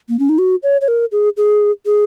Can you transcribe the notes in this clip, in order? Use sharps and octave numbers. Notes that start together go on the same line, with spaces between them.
A#3
C#4
D#4
F#4
C#5
C#5
A#4
G#4
G#4
G#4